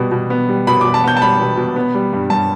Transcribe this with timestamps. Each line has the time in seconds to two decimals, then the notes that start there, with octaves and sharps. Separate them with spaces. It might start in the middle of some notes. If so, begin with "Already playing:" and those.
Already playing: B2 G3 B3
0.11 B2
0.30 B3
0.49 G3
0.67 B2 B5
0.81 B2 D6
0.94 A5
1.04 B3 G6
1.17 A5
1.22 G3 B5
1.40 B2
1.57 B2
1.76 B3
1.95 G3
2.13 G2
2.30 G2 A5